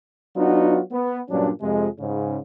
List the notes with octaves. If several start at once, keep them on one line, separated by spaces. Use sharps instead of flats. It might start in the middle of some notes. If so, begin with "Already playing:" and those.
F#3 B3 D4 D#4 F4 F#4
B3
G2 A#2 F#3 C#4 D4
F2 C3 G#3
G#2 C#3